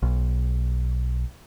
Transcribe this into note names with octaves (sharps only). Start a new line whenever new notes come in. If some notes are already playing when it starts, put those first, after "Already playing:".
B1